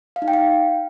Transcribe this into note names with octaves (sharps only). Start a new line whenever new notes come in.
F5
D#4
G5
F5